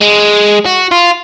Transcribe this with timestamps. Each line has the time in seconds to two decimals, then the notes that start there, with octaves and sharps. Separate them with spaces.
0.02 G#3
0.66 F#4
0.92 F4